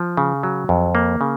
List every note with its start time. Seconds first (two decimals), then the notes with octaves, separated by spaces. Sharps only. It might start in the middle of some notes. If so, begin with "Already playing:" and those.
Already playing: F3
0.17 C#3
0.43 F#3
0.69 F2
0.95 A#3
1.21 C#3